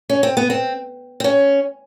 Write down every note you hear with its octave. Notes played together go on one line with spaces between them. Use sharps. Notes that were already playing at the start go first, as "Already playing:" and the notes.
C#4
C4
B3
C4
C4
C#4